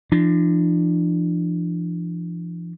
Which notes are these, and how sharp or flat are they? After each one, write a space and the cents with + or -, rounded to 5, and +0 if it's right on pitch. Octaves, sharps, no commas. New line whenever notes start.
F3 -40 D4 +25